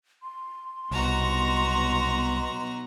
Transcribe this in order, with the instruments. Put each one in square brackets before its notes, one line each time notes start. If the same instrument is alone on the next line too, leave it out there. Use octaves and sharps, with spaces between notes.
[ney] C6
[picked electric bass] C2 [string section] B2 F#3 D#4 [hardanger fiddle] F#4 A#5